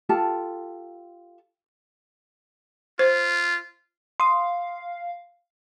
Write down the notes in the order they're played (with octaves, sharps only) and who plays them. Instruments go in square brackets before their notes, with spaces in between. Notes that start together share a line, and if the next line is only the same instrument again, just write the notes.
[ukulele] F4 G4 A4 A5
[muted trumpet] F4 [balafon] C5
[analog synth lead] F5 [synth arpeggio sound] C6 D#6